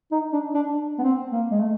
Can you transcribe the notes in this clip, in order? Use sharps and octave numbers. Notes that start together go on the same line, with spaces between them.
D#4
D4
D4
B3
C4
A#3
G#3
A3